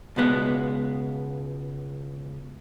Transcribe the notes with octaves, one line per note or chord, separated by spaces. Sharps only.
C#2 B2 G#3 B3